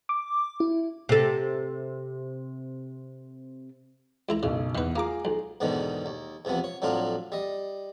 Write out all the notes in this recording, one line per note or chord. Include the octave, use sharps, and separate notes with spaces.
D6
E4
C3 A4
C#2 E4 A#5
F#1 B1 C#3
E2 D#3 B4
A#3 F4 G#4 A#5 D6
B1
E2 G#2 B2 D3 D#3
D#2
E2 C3 F3 B3
C#5
F2 A2 F#3 D4 F4
G3 D#5